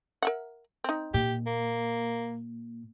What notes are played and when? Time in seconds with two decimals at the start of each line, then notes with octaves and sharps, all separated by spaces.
0.22 A#4 E5 F#5
0.84 C4 D#4
1.14 A#2 G4
1.46 A#3